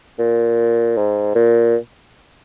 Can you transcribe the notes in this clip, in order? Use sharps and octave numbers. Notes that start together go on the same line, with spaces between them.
A#2
G#2
A#2